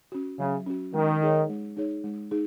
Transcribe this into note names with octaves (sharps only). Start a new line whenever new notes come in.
C#4 F#4
C#3 F#3
C#4 F#4
D#3 G#3
D#4 G#4 C#5
G#3
D#4 G#4 C#5
G#3
D#4 G#4